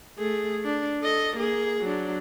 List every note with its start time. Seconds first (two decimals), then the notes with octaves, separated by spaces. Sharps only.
0.18 A3 G#4
0.65 D4
1.02 A4 D#5
1.37 A#3 G#4
1.81 F#3 D4